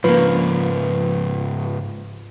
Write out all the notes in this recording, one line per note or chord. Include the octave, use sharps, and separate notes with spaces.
G#2 C#3 F3 A#3 B4